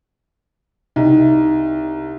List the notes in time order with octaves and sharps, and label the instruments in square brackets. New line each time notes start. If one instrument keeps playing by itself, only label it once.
[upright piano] C2 [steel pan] D#4